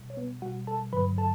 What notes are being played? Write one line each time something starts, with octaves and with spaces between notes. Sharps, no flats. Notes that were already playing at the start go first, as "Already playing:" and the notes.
Already playing: B2 G3
C#5
B3 B4
B2 G3 F#4 F#5
A4 A5
G2 D3 F#3 B4 B5
A4 A5